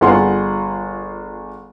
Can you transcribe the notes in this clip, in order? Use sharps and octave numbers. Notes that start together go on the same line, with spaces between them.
G1 F4 G#4 F#5 C6